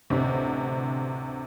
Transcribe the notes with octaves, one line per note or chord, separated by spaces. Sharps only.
A1 D2 C3